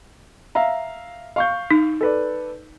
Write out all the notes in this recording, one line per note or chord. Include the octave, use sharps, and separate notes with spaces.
E5 F5 A#5
F5 C#6 G6
D#4
A4 B4 D5